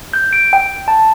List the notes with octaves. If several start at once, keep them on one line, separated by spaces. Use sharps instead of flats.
G6
D7
G5
A5